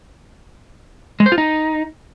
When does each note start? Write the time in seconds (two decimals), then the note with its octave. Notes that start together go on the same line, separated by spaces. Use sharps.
1.20 G#3
1.26 C5
1.32 F4
1.38 D#4